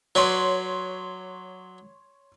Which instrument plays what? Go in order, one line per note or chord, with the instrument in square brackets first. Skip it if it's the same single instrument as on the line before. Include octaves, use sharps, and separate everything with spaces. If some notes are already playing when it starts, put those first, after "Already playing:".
[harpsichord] F#3 B4 D5 [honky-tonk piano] C#5 C6